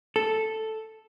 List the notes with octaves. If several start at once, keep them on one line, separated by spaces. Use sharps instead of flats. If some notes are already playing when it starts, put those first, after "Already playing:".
A4